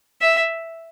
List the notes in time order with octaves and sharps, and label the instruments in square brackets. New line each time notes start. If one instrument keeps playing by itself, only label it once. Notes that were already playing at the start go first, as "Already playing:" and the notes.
[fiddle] E5